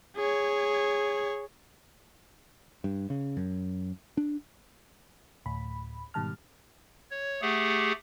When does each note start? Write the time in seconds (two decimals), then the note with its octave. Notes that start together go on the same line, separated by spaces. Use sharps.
0.17 G#4 C#5
2.84 G2
3.10 C#3
3.37 F#2
4.17 D4
5.46 D2 A2 B5
6.14 G#2 B2 D#3 G3 A5 F6
7.11 C#5
7.42 A3 G4 G#4 F#5